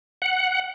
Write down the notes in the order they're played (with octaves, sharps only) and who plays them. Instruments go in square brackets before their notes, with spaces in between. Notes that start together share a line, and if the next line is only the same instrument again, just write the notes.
[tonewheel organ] F#5